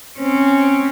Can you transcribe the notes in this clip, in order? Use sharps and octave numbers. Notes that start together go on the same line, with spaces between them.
C4 C#4